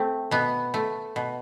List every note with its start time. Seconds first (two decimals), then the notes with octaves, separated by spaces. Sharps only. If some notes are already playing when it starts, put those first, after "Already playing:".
Already playing: A3 C4
0.31 B2 B3
0.74 A3
1.16 B2